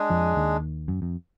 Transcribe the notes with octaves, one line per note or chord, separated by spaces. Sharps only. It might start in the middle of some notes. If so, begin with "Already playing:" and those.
Already playing: G#3 D4 G#4
F2 F3
D#2 D#3
F#2
F2